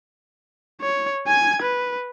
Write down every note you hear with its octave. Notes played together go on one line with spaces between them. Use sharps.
C#5
G#5 G#6
B4